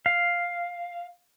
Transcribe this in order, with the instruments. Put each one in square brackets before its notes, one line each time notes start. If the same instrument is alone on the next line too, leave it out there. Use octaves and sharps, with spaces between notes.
[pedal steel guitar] F5